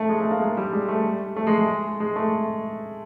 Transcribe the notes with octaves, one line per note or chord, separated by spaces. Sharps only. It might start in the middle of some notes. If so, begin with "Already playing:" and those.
Already playing: A3
G#3
A3
A#3
G#3
G3
G#3
A3
A3
G#3
G#3
G#3
A3